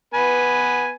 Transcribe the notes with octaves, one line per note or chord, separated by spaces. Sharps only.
B3 B4 G#5